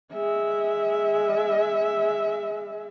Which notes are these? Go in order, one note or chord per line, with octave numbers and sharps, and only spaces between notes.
G#3 E5